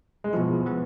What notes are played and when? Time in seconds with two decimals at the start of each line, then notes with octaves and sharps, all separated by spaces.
0.24 G#3
0.33 B2 F3 B3 E4
0.66 E3 B3